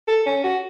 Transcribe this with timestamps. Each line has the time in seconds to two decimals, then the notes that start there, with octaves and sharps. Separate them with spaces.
0.08 A4
0.26 C#4
0.44 F#4